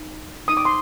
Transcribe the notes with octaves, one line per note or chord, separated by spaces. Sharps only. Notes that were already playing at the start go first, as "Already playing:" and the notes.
Already playing: D#4
D#4 A#4 D#6
D6
C6